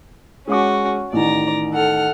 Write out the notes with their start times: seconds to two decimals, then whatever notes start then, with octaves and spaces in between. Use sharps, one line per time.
0.48 G#3 C#4 F#4 D6
1.13 A1 D#3 D5 A#5
1.73 A4 F#5 F6